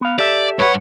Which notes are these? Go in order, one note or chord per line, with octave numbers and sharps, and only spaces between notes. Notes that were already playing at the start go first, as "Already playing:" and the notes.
B3 F5
G4 A4 D5 E5
G2 B4 C#5 F#5